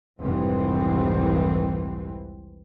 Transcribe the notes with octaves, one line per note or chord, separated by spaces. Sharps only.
F1 C2 G#2 E3 C4